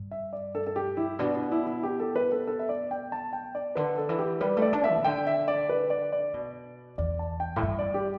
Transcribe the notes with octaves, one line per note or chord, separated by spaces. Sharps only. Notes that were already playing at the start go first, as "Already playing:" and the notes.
Already playing: G2
E5
D5
A4
A4
G4
E4
B2 D4
D4
E4
E4
G4
A4
B4
A4
A4
E5
D5
G5
A5
G5
D5
D3 B4
A4
E3
G4
G3 B4
A3
D5
D4
E5
E3
B2
D3 G5
E5
D5
B4
D5
D5
B2
E2 D5
A5
G5
A2
G2 E5
D5
G4